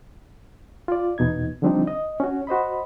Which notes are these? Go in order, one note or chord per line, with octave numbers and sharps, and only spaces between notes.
F4 D5
E2 B2 D#4 G#6
D3 F3 G3 C4 D4 D#4
D#5
C#4 F#4
F#4 C5 D#5 B5